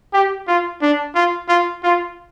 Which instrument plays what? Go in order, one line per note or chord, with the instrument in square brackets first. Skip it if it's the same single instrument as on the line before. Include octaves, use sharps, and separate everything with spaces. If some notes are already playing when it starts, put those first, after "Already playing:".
[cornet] G4
F4
D4
F4
F4
F4